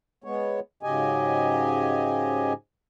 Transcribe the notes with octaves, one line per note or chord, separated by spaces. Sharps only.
G#3 B3 C#5
G#2 C#3 F#3 G4 D#5 G#5